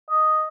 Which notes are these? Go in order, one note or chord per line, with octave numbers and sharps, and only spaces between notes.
D#5